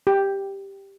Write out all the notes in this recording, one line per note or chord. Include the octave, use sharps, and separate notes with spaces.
G4